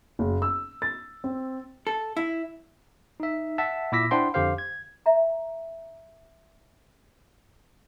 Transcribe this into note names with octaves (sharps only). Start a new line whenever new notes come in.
F#1
E6
A6
C4
A4
E4
D#4 E5
E5 F#5 A5
A#2 E4 D6 E6 A#6 B6
D4 E4 C5 F#5 G5 C6
F2 D3 G4 C5 F5
G#6
E5 A#5